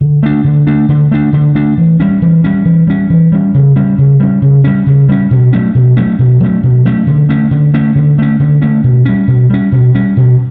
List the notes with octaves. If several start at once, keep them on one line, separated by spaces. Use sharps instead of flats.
D3
A3 D4
D3
A3 D4
D3
A3 D4
D3
A3 D4
E3
G3 C#4
E3
G3 C#4
E3
G3 C#4
E3
G3 C#4
C#3
G3 C#4
C#3
G3 C#4
C#3
G3 C#4
C#3
G3 C#4
B2
F#3 A3 C#4
B2
F#3 A3 C#4
B2
F#3 A3 C#4
B2
F#3 A3 C#4
D3
A3 C#4
D3
A3 C#4
D3
A3 C#4
D3
A3 C#4
B2
G3 C#4
B2
G3 C#4
B2
G3 C#4
B2